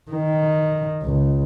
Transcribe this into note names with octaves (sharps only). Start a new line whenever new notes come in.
D#3
C#2